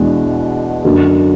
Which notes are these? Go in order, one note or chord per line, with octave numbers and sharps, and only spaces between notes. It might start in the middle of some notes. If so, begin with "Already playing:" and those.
Already playing: E2 B2 G#3 D4
F#2 D3 F#3